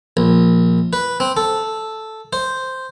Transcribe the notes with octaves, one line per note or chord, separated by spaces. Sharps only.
A#1
B4
C4
A4
C5